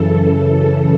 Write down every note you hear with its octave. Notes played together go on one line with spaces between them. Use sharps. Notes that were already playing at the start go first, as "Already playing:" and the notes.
Already playing: F#2 C#3 E3 A4
A4